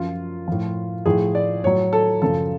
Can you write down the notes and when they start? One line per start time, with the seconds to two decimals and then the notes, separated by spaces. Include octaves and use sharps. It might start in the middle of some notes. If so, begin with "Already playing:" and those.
Already playing: F#2 F3 F4
0.48 A2 F3
1.06 A2 F3 G#4
1.35 D5
1.63 A2 F#3 C#5
1.93 A4
2.22 F#2 C#3 F3 A4